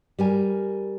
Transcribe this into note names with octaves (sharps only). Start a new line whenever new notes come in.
G3 A#4 G#5